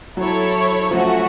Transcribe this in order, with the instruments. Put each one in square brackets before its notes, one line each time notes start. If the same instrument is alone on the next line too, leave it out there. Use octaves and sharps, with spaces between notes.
[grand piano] F#3 [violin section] E4 A4 C#5
[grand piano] F3 [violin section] A3 C#4 F#4